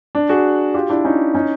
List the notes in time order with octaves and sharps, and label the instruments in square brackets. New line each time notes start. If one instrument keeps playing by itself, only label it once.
[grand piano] D4
F#4 G#4
F4 G4
D4 E4
C#4 D#4
C#4 D#4